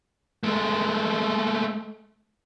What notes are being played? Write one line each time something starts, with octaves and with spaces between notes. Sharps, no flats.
G#3 A3